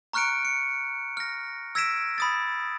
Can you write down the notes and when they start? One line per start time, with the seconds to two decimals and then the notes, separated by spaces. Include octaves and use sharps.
0.13 A#5 C#6 F6 F#6 C#7 D7
0.45 C#7
1.17 F6 A#6
1.75 E6 G#6 A#6 B6 D7 E7
2.18 B5 D#6 A6